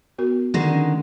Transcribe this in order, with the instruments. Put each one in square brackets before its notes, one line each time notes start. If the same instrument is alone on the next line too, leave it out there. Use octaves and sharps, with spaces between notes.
[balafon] B3 F#4 A#4
[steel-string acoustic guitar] D3 D#3 G#3 [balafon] D5
[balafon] C#4 D4